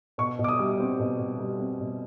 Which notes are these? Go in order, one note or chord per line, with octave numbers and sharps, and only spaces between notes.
B2 C#6
B2
D6
D#6
G3
C4
B2
B2
G3
C4
B2